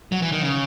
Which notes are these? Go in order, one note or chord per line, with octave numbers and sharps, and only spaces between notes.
F#3
E3
D#3
C#3